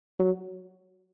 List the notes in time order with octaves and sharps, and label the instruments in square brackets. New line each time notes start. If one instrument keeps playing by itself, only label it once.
[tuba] F#3